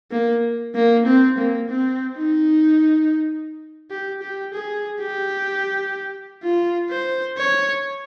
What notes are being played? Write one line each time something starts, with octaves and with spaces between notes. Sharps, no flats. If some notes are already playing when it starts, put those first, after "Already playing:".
A#3
A#3
C4
A#3
C4
D#4
G4
G4
G#4
G4
F4
C5
C#5